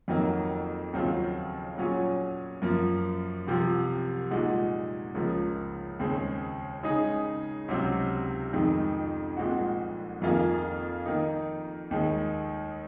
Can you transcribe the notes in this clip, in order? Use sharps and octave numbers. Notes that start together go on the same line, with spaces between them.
F2 D#3 F#3 A#3
D#2 C#3 F#3 C4 F4
A#2 F#3 C#4 G#4
F#2 F3 A#3
C2 C3 F3
A#2 G#3 D#4 F#4
C#2 C#3 F3 A#3
D#2 C#3 G#3 C4
C#3 G#3 D#4 G#4
C#2 C3 F#3 C4
F2 D#3 G#3 D#4
C2 A#2 G#3 C4 F#4
F2 D#3 A#3 F4 G#4
D#3 A#3 D#4
D#2 D#3 G#3